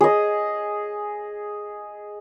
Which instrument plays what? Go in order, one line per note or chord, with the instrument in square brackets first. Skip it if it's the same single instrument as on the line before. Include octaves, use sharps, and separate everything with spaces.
[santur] G#4 D#5